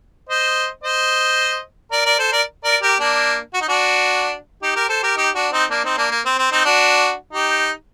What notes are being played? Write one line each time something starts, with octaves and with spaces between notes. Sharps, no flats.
C5 D#5
C5 D#5
A#4 D5
A#4 D5
A4 C5
A#4 D5
A#4 D5
G4 A#4
A#3 D4
F#4
D#4
D4 F#4
D#4 G4
G4 A#4
A4 C5
G4 A#4
D#4 G4
D4 F#4
C4 D#4
A#3 D4
C4 D#4
A#3 D4
A#3
C4
C4
C4 D#4
D4 F#4
D#4 G4